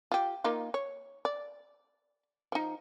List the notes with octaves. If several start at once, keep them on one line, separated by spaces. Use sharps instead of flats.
F4 G4
A#3 D#4 F4
C#5
D5
F3 D#4